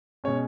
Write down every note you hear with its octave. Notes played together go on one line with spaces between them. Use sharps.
B2 G#3 C#4 C#5